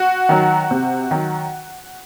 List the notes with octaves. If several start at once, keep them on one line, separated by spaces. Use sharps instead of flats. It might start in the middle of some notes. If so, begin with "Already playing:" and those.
Already playing: F#4
D#3 F#3
C3
D#3 F#3